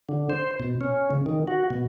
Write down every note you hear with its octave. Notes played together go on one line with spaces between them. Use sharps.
D3
C5
B2
C#4
C#3
D#3
F#4
B2